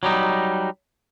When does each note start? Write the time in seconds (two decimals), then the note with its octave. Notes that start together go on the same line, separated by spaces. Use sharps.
0.03 F#3 G3 D#4